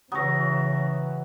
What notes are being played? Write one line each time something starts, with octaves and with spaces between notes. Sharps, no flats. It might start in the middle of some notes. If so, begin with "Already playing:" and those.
C#3 E3 F#3 C#6 D#6 A#6